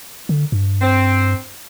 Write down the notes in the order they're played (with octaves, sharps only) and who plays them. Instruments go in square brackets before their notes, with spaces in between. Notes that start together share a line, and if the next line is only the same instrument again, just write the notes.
[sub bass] D3
G2
[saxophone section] C4